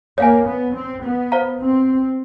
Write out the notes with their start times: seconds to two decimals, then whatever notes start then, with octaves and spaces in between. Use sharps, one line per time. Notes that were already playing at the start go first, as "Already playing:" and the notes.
0.18 A#3 C#5 F5 G#5
0.47 B3
0.74 C4
1.03 B3
1.32 C5 F5 A#5
1.59 C4